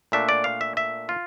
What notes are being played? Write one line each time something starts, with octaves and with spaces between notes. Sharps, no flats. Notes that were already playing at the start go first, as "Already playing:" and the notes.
A#2 A3 D4 E5
D5
F5
E5
E5
F4